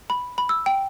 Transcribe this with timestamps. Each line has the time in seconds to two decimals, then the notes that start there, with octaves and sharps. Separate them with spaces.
0.10 B5
0.38 B5
0.49 E6
0.66 G5